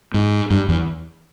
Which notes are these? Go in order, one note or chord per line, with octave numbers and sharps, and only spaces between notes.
G#2
G2
E2